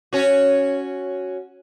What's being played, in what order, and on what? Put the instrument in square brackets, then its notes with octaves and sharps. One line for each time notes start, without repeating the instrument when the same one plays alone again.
[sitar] C#4 F#4